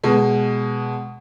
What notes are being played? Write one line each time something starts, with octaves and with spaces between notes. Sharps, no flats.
B2 G#3